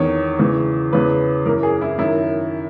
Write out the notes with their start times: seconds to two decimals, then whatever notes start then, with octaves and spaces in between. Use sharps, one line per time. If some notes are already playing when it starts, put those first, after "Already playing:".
Already playing: E2 D#3 C#5
0.39 E2 C#3 E3
0.93 E2 C#3 E3 B4
1.46 F#2 E3 A#4
1.63 G#4
1.81 E4
1.98 F#2 D#3 E4